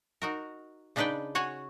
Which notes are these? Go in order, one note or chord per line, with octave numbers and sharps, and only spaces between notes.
D#4 F#4 A#4
C#3 D4 D#4 B4 D5 G5
F#4 C#5 F#5 G#5